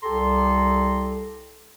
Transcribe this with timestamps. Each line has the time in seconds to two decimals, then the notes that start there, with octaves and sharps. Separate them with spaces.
0.03 C2 G4 A4 A#5 C6